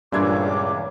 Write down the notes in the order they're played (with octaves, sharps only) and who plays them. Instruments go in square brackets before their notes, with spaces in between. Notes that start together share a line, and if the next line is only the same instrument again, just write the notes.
[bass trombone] C#2 [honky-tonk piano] G2 G#6 [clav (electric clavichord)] A#2 E3 D4 [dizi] D6